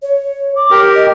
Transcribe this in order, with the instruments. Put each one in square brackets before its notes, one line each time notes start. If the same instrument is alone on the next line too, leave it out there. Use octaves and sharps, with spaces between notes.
[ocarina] C#5
D6
[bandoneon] G4 A#4
[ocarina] D#5